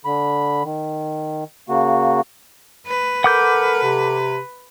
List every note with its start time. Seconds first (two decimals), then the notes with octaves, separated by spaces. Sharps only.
0.05 D3 B5
0.64 D#3
1.69 C#3 A#3 F#4
2.87 B4
3.24 A4 A#4 F#5 D6 G6
3.83 C3